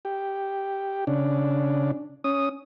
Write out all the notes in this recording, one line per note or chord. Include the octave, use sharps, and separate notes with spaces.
G4
C#3 D4
C#4 D#6